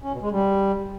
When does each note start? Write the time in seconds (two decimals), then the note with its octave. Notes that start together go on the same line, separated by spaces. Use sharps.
0.03 C#4
0.12 B2
0.22 G#3
0.31 G3